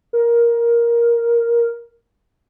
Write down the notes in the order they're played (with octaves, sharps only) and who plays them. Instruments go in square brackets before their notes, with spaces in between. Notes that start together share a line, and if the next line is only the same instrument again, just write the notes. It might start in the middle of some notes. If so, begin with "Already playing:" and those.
[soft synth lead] A#4